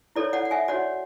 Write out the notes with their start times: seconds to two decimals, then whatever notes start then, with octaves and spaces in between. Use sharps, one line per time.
0.16 E4 A4 C#5 D5
0.33 D5 F#5
0.45 F#5
0.51 E5 G#5
0.68 F#4 C#5 D5 F#5